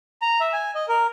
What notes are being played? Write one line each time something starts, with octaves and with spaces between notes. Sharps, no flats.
A#5
E5
G#5
D#5
A#4